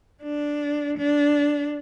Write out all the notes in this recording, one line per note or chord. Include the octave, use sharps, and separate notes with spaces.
D4
D4